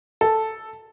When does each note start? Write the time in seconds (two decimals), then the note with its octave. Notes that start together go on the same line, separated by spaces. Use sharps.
0.21 A4